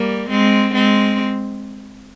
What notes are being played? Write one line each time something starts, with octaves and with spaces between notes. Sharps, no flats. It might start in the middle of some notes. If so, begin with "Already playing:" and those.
Already playing: G3 A#3
G#3 C4
G#3 C4